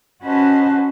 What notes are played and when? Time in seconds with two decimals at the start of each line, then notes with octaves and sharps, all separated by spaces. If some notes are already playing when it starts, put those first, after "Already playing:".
0.23 C#4 F#4 B4 C5 D#5 A5